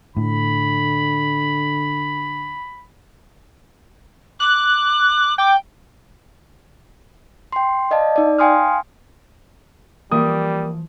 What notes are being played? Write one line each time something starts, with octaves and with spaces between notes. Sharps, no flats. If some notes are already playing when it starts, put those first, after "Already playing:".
A2 D3 B5
D6 F#6
G5 D6
G5 C6
D5 D#5 F5 A5
D#4 D5
F5 G5 G#5 C6 D#6 F6
E3 F3 G3 A#3 D#6